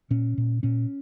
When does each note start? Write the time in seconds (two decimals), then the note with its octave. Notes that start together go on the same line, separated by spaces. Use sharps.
0.10 A#2 C#4
0.38 A#2
0.63 A#2 C#4